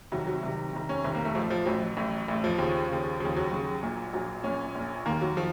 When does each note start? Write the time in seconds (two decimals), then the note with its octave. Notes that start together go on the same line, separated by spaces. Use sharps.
0.12 C2 C3 D#3 F#3
0.27 F#3
0.43 C2 C3 D#3
0.73 C2 C3 D#3
0.89 C#4
1.04 C2 C3 D#3 C4
1.15 A#3
1.25 A3
1.35 A1 A2 F3
1.50 F3
1.66 A1 A2 F#3
1.97 A1 A2
2.28 A1 A2
2.44 F3
2.58 D#2 C#3
2.89 D#2 C#3
3.20 D#2 C#3 F3
3.36 F#3
3.51 D#2 C#3
3.83 A#1 A#2
4.13 A#1 A#2 F#3
4.44 A#1 A#2 C#4
4.75 A#1 A#2
5.06 D#2 D#3 A#3
5.21 F#3
5.37 D#3 F3